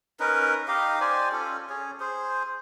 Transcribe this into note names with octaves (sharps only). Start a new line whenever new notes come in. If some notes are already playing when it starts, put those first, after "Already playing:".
C#4 D#4 A#4 B4
D#4 G4 D#5 F5
G4 C5 D5 G#5
C#4 F4 A4
C#4 G#4 C#5
G#4 C5